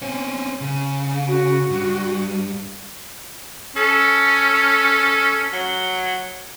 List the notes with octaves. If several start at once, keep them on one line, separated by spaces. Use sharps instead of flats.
C4 C#4
C#3
F#4
G2
C#4 A4
F#3